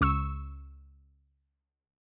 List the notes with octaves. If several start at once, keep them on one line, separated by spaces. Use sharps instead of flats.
C#2 C#6 E6